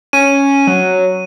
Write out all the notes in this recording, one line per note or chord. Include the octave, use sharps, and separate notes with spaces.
C#4 D#7
F#3